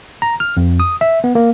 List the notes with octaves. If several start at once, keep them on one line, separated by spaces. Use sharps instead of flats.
A#5
F6
F2
D#6
E5
B3
A#3